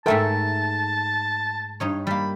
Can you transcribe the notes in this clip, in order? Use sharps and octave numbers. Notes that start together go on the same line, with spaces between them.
G#2 A3 A4 A#4 E5 G5 A5
G2 D#4 C#5
G3 A#3 B5